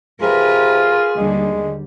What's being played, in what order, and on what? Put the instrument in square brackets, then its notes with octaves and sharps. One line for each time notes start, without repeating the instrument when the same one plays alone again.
[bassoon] C3 [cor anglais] F4 [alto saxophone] G#4 [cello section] A#4 B4
[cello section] D#2 D3 G3 [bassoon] G#3